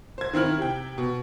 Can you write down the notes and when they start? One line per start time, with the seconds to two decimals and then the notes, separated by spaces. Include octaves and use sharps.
0.18 C5 G#6
0.33 D#3 C4 E4 F6 F#7
0.58 C3 G5
0.98 B2